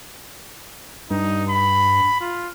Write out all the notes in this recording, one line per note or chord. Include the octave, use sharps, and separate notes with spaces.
G2 D#4
B5
F4